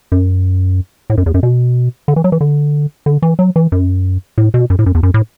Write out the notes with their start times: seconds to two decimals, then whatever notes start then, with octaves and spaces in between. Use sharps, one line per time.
0.12 F#2
1.10 A2
1.18 F#2
1.26 E2
1.34 F#2
1.43 B2
2.08 D3
2.16 E3
2.24 F#3
2.32 E3
2.41 D3
3.06 D3
3.22 E3
3.39 F#3
3.56 E3
3.72 F#2
4.38 A2
4.54 B2
4.70 F#2
4.79 A2
4.86 F#2
4.95 E2
5.03 F#2
5.14 A2